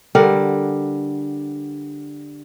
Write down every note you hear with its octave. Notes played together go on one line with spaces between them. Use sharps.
D3 G3 A#4 F#5